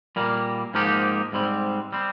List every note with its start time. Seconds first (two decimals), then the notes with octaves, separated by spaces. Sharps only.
0.16 A#2 G3 A#3
0.74 G#2 F3 A#3 D#4 G4
1.32 G#2 G3 C4
1.93 G3 C4